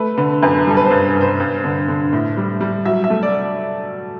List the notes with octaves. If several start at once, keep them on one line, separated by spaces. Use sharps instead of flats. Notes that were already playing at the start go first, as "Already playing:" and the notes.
Already playing: A3 B4
D3 B4
F#2 B4
G3 A4
B4
C5
G2
G2
C5
G2
D3
D3
A2
G3
G3
F#3 E5
E5
A3
D5